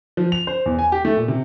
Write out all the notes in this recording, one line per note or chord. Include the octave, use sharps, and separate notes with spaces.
F3
F7
C5
E2
G#5
G4
A3
A#2
C3